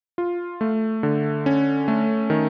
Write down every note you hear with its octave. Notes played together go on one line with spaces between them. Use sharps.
F4
A3
D3
C#4
A3
D#3